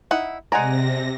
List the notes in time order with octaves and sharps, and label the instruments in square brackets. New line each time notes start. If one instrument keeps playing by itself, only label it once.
[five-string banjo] D#4 E4 F#5
[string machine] C3 A#6 [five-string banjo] G#3 D5 [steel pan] F#5 G#5 A#5